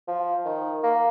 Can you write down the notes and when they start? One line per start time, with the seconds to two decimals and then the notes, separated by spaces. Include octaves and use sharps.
0.08 F3
0.45 D#3
0.83 A#3